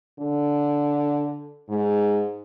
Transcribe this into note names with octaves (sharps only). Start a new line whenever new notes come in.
D3
G#2